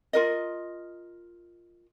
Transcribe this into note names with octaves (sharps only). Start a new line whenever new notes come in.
F4 A#4 D#5